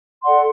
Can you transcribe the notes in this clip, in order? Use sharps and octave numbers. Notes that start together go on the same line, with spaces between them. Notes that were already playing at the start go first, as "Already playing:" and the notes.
A4 D5 F#5 C6